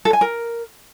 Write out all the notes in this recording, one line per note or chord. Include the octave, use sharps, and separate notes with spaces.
A4
G#5
A#4